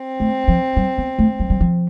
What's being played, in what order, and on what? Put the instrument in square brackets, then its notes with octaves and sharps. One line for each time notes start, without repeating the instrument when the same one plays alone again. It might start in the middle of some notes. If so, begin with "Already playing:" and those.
Already playing: [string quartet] C4
[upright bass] A3
F3
G3
B3
A3
G3
G3
F3